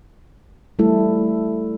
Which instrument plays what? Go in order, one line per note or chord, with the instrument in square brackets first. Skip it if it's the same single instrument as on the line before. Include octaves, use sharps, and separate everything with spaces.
[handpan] G3 A3 E4 A4